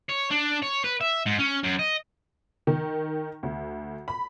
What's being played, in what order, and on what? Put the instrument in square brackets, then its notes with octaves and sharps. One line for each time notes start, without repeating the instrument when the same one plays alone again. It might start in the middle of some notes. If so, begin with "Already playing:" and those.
[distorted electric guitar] C#5
D4
C#5
B4
E5
G#2
C#4
F#2
D#5
[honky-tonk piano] D#3
D2
B5